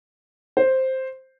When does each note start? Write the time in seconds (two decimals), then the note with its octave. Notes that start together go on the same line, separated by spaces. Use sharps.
0.57 C5